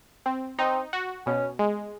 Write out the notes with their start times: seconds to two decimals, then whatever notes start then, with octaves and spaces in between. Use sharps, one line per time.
0.26 C4
0.59 C4 D#4
0.93 F#4
1.26 B2 C#4
1.59 G#3